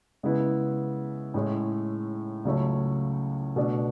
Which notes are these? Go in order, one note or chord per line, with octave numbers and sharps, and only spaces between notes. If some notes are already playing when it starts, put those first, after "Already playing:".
C#3 G#3 B3 E4
A2 G#3 C#4 E4
C#2 C#3 F#3 A3 C#4
B2 A3 D4